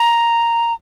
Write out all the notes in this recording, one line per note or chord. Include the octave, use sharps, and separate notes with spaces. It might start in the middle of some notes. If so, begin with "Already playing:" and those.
Already playing: A#5